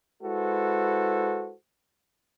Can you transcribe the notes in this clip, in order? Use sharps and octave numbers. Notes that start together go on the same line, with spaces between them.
G#3 E4 F#4 A4 B4 C5